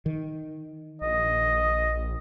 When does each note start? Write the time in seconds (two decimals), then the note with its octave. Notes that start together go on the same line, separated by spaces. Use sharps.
0.06 D#3
1.02 A#1 D#5